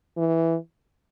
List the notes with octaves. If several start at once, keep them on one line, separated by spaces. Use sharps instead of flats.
E3